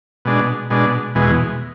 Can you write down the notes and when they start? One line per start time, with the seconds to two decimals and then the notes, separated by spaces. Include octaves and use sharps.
0.25 B2 G#3 D4
0.70 B2 G#3 D4
1.15 E2 B2 G#3